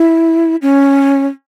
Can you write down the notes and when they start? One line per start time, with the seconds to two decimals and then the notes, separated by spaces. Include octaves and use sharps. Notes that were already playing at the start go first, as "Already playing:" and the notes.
Already playing: E4
0.62 C#4